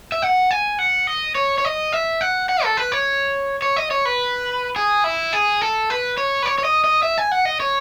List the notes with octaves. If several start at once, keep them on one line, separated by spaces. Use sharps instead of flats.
E5
F#5
G#5
F#5
D#5
C#5
C#5
D#5
E5
F#5
F#5
A4
B4
C#5
C#5
D#5
C#5
B4
G#4
E4
G#4
A4
B4
C#5
B4
C#5
C#5
D#5
D#5
E5
G#5
F#5
D#5
C#5